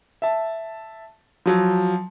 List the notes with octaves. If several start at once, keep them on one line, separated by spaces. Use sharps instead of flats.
E5 A5
F3 F#3